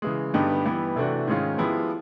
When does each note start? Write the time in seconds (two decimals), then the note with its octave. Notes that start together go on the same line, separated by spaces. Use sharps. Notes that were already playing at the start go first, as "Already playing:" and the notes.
0.02 C#3 E3 G#3
0.34 G2 D3 G3 B3 D#4
0.65 E3 G3 B3 E4
0.96 C3 E3 A3 D4 F#4
1.27 G#2 D#3 G#3 C#4 F4
1.58 F3 G#3 B3 E4 G4